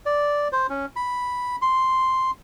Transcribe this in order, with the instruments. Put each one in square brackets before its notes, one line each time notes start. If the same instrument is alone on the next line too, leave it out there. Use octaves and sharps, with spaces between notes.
[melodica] D5
C5
C#4
B5
C6